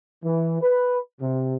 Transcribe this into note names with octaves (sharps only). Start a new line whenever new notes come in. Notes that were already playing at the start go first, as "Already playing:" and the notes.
E3
B4
C3